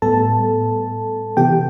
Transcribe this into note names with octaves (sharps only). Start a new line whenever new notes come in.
A2 G3 B3 A4 A5
C3 E3 B3 G4 G5